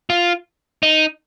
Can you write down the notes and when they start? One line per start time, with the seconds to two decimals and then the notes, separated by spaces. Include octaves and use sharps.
0.10 F4
0.83 D#4